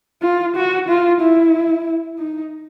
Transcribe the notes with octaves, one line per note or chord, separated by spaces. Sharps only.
F4
F#4
F4
E4
D#4